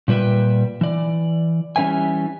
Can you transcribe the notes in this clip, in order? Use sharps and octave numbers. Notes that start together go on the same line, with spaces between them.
A#2 G3 B4 E5 G5
E3 D5
E3 G3 C#4 B4 E5 G#5